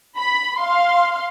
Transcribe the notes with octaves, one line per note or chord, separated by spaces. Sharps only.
B5
F5 C6